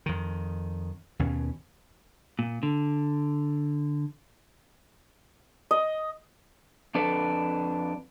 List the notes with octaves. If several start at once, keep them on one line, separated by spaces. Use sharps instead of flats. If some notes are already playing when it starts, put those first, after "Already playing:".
F2 D#3
D#2 B2 C#4
A#2
D3
D#5
F2 D4 A4 B4